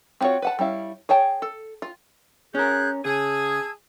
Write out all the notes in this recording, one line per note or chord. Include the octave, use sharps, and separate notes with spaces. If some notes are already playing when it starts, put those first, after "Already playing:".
C4 C#4 F4 F#4 C#5
B4 F#5 A5
G3 C#4 E4 F5
G#4 C#5 G5 A5
A4
F4
C#4 G#4 A#4 F#6 G6
C#3 G#4 A5 E6 G#6